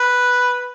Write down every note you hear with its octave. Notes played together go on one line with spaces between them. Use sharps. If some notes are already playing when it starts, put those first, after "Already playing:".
Already playing: B4